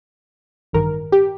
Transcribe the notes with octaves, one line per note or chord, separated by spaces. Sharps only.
A1 G2 D#3 A#4
G4